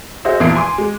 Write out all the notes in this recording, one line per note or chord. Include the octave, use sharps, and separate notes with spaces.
F#4 G#4 C5 D#5 E5
E2 A#2 E3 F3 C7 D7
G#5 C6 D6
G#3